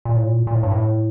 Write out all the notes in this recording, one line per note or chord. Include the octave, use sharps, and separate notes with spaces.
A#2
A2
A#2
A#2
A2
G2
A2